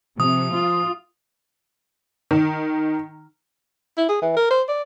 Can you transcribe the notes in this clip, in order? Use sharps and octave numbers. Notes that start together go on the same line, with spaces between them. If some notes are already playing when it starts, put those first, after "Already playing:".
C3 F3 D#6
F4
D#3
E4
G#4
E3
A#4
C5
D5